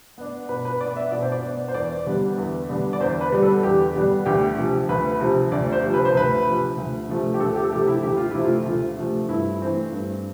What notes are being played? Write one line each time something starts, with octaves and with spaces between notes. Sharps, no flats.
B3 D4
B2 B4
B4
B3 D4 D5
E5
B2 D5
C5
D5
B3 D4
C5
E2 D5
D3 G3 B3 D4
E2
D3 G3 B3 D4
D5
E2 C5
B4
D3 G3 B3 D4
A4
E2 G4
D3 G3 B3 D4
D2 G4
C3 F3
D2 B4
C3 F3
D2 D5
C5
C3 F3
B4
C5
D2 B4
C3 F3
D2
C3 F3 A3
G4
D2 A4
G4
A4
C3 F3 A3 G4
E4
D2 G4
F4
C3 F3 A3 E4
F4
D2 F4
C3 F3 A3
G2 E4
E3 A3 C4
G2